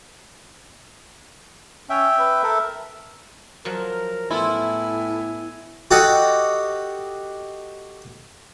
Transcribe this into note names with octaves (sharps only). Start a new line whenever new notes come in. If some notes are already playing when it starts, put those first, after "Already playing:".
C#4 E5 G5
B4
A4 A#4 E5
F3 F#3 A#4
A2 B3 E4 F4 G#5
F#4 G4 A4 D#5 F#5